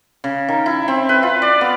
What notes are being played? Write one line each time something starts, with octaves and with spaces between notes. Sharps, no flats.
C#3
D#3
E4
C4
B4
F4
D5
B3